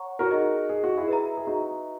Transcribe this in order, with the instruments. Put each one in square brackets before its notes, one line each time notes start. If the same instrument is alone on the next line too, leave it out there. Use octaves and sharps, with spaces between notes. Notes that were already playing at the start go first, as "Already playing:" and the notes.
Already playing: [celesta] C#5 F#5 A#5 C#6
[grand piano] F#4 A#4
[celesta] D#4 G#4 D#5
[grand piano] G#4
F#4
E4 G#4
[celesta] B4 E5 A#5
[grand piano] G#4
D#4 F#4